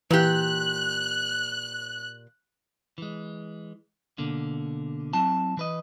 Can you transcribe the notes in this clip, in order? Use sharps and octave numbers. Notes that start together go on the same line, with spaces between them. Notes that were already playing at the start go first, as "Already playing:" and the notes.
A#2 E3 G4 F#6
E3 G#3
B2 D3 A#3
F#3 C4 E4 A5
E3 B4 D#5